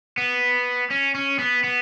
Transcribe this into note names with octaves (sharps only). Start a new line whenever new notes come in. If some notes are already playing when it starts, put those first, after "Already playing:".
B3
C#4
C#4
B3
B3